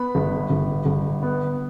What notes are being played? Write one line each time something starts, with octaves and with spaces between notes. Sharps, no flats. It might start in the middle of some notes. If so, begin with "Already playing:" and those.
Already playing: B3 B5
G1
G1
G1
B3